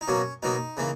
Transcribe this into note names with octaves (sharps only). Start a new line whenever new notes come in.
D#4
B2 F#3 A#3 C#4
B2 F#3 A#3 D#4
C#3 E3 A#3